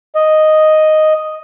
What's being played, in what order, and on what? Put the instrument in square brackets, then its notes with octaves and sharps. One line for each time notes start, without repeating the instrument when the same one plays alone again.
[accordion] D#5